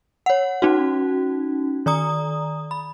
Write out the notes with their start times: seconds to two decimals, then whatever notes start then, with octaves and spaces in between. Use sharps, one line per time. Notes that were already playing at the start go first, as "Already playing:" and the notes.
0.26 C#5 F#5
0.62 C#4 D#4 F#4
1.86 D#3 D5 A#5 D#6
2.71 B5